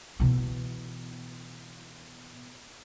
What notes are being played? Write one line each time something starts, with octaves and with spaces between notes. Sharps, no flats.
B2 E3